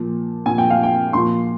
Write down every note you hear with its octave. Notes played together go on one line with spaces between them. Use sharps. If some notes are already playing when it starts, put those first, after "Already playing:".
Already playing: A#2 F3
A#2 F3 G#5
G5
F5
G5
A#2 F3 C6